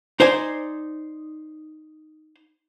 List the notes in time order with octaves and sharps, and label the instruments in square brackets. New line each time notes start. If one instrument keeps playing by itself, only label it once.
[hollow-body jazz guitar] D#4 C5 D5 G#5